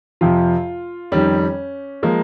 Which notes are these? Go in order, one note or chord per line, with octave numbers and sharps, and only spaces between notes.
F2 C3 F3 F4
F2 D#3 G3 C#4
F3 G#3 A#3